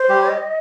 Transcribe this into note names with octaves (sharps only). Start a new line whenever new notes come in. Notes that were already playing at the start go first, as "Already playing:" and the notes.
Already playing: C5
G3 G4
D#5